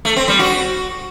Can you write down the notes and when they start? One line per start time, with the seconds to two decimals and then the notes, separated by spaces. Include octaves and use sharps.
0.05 A3
0.16 C4
0.28 G3
0.39 F#4